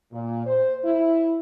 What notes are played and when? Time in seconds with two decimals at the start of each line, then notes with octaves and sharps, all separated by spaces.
0.13 A#2
0.46 C5
0.85 E4